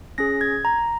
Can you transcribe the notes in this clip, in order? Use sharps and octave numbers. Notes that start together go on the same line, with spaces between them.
C#4 G#4 A#6
G#6
A#5